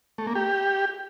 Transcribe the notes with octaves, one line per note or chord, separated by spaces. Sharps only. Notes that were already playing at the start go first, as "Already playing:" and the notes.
A3
A#3
G4